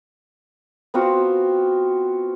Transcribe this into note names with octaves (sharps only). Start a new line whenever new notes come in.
B3 C4 F4 F#4